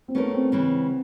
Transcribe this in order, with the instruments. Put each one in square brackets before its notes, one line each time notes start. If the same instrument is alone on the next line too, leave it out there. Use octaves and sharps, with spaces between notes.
[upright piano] C4
[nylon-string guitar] A3 C#4 F4 A#4 [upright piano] B3
[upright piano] C4
[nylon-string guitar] C#3 E3 G#3 [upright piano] C4